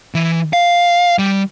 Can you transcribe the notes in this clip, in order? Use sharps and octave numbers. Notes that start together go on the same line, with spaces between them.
E3 E5
F5
G3